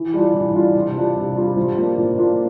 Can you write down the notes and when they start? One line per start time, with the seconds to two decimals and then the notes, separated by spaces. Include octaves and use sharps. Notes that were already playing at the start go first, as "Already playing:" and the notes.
Already playing: E3
0.13 G3 D4 F4
0.34 E3
0.55 G3 D4 F4
0.75 C3
0.95 G3 D4 F4
1.16 C3
1.36 G3 D4 F4
1.57 F3
1.77 A#3 D4 F4
1.98 F3
2.18 A#3 D4 F4